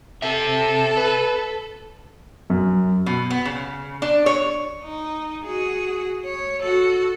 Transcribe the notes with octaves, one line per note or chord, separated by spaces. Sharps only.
C3 A4 E5
B4
F#2
B2
B3
C#3
D4
C#5
D#4
F#4 G#4
C#5
F#4 A4